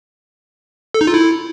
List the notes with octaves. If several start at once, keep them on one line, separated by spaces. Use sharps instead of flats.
A4
D#4
F4
E4